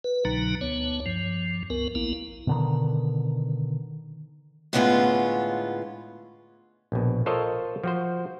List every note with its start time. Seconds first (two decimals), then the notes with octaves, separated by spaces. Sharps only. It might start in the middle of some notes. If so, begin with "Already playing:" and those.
0.04 B4
0.25 C2 B2 D3 F#3 D#4 A#5
0.61 D2 B3 C#5
1.06 G2 F3
1.70 C#2 B3 A#4
1.95 A#1 A#3 B3 E4
2.47 B2 D3 D#3
4.73 A2 D3 G#3 B3 C#4 F4
6.92 A#1 B2
7.26 F4 A4 A#4 C5 C#5 D#5
7.84 F3 F#4 C5